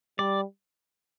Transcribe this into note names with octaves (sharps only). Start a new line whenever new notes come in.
G3 D5